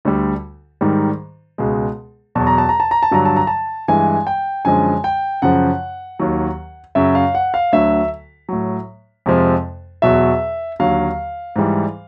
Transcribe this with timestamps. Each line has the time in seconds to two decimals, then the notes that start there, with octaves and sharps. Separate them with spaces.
0.05 D2 D3 G3
0.81 G#2 D#3 G3
1.58 C#2 B2 G#3
2.35 E2 B2 F#3 A5
2.47 A#5
2.58 A5
2.69 A#5
2.80 A5
2.91 A#5
3.03 A5
3.11 G2 D3 F#3 A#5
3.25 A5
3.36 A#5
3.47 A5
3.88 G2 E3 G#3 G#5
4.27 G5
4.65 F#2 D3 F3 G#3 G#5
5.04 G5
5.42 F#2 C#3 F3 F#5
6.19 D#2 D#3 F#3
6.95 F#2 C#3 F#3 E5
7.15 F5
7.35 F#5
7.54 F5
7.72 D2 D3 F#3 E5
8.49 A2 F#3
9.26 F2 C3 F3 G#3
10.02 E2 B2 F#3 E5
10.80 D#2 D3 F#3 F5
11.56 G#2 E3 G3